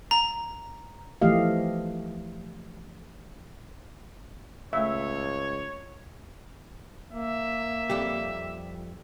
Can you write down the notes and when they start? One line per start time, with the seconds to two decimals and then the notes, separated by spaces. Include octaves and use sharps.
0.11 A#5
1.22 E3 F3 A3 G4 D#5 F5
4.73 C#2 A3 C#5 E5 F5
7.11 A#3 E5
7.90 F2 G3 G4